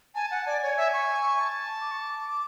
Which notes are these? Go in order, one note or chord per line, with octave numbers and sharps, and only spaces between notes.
G#5 A5
F#5
D5 G#5
C#5
E5
C#6
A5
D6
C#6
D6